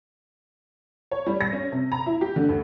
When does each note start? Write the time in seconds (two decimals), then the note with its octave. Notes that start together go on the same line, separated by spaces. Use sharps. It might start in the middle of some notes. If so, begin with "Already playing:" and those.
1.11 C#5
1.27 G3
1.41 A#6
1.52 C#4
1.72 C3
1.92 A#5
2.06 E4
2.21 G4
2.36 D3
2.49 D2